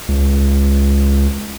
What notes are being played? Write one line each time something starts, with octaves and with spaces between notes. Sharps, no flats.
C#2